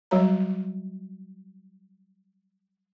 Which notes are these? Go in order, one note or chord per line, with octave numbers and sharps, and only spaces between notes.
F#3 G3 F#4 C#5 A#5